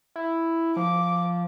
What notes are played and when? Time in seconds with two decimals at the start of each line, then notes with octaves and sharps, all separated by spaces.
0.16 E4
0.76 F3 D6